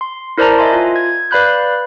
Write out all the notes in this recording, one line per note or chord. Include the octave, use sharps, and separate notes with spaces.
C6
E4 A#4 C5 D5 A5 A#5
D#5 E5 G#5 C6
F4
G#6
B4 D5 F5 B5 F#6 G6